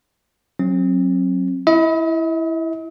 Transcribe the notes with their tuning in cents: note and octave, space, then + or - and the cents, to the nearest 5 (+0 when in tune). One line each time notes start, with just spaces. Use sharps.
F#3 +0 C4 +40
E4 +0 D#5 +45